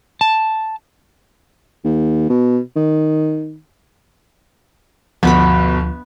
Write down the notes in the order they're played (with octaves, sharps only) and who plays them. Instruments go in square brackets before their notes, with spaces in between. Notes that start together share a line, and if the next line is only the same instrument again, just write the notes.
[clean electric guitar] A5
[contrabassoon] D#2
B2
D#3
[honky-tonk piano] G1 B2 [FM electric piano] D2 F3 [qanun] B3 B4 B5